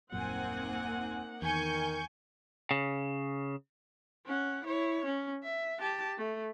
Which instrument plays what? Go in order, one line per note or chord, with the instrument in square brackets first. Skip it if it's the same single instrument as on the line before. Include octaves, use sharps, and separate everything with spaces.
[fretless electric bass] D#1 F#2 A#2 [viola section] A#3 D#4 F#5 [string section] C4 G#5
[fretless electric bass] E2 [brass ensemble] D#3 A#4 [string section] G#5 C#6 G6
[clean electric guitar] C#3
[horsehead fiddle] C#4 F#5
E4 C#5
C#4
E5
G4 A5
A3